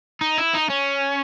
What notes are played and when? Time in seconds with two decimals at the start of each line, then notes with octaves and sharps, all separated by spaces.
0.21 D#4
0.38 E4
0.54 D#4
0.69 C#4